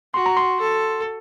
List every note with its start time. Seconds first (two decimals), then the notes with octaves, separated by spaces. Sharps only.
0.14 F#4 C6
0.26 A#5
0.37 C6
0.60 A4